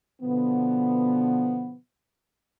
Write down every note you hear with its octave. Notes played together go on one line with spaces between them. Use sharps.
B2 D3 F3 B3